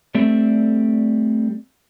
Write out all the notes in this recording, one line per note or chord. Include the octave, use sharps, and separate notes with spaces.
G3 A3 C4 D5 E5